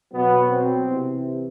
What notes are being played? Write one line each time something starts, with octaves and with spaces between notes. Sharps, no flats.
B2 F#3 B3
C4
C3 E3